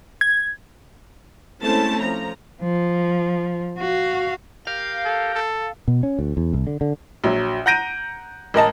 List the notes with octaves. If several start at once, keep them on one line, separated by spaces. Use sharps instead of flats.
G#6
G#3 A3 C4 C#4 E4 A5
F3 A#5
F3
F#4 F5
G4 A#4 F5 G5
A4
A4
B2
C#4
D2
E2
C2
D3
D3
A#1 F#3
F#5 A#5 G6 A#6 D7 D#7
A1 A#4 D#5 A5